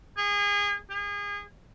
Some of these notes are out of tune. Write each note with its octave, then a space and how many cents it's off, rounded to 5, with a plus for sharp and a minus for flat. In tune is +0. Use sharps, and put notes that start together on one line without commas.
G#4 -30
G#4 -30